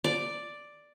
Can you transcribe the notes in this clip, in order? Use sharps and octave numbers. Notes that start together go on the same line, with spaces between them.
D5